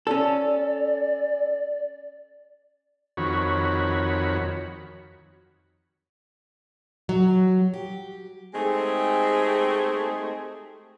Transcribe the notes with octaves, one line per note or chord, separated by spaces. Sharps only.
C#4 A4 D5
F2 D#3 F#4 C#5 B5
F#3
G4
G#3 A3 C4 D#4 G4 G#4